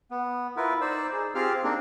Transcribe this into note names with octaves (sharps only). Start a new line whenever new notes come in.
B3
E4 F4 A#4 B4
D#4 C5 D5 E6
G#4
C4 F4 G4 G#4 F5 F6
A#3 C4 D4 D#4